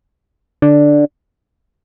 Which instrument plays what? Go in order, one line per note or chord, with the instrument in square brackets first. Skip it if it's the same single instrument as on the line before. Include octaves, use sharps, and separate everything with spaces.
[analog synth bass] D3